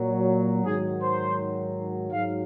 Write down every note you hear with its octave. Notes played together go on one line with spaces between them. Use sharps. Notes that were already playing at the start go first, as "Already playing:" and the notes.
Already playing: A#2 F#3
G#2 D#3 F#3 G#4
C5
G#2 F#3 F5